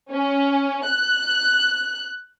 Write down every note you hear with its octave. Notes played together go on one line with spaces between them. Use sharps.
C#4
F#6